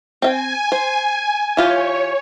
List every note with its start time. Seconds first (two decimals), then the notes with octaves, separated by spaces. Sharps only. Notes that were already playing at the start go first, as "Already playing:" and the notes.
0.22 C4 E5 G5 G#5
0.72 C5
1.57 E3 F4 G4 C#5